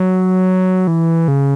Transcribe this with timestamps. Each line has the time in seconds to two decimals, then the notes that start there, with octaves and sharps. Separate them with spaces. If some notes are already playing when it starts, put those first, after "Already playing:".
Already playing: F#3
0.87 E3
1.28 C#3